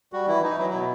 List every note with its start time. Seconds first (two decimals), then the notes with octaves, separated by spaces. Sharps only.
0.13 G3 F#4
0.28 E3 E4
0.43 E3 D#4
0.58 F#3 E4
0.70 B2 E4